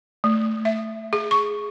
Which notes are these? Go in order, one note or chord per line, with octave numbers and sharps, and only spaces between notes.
A3
E5
G#4
C#6